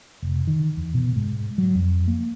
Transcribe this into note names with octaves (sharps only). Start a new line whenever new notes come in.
F1
D#3
E2
B2
G#2
F#3
F2
A#3